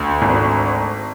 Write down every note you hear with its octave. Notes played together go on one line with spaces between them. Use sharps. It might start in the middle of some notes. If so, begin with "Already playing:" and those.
Already playing: D2
G#1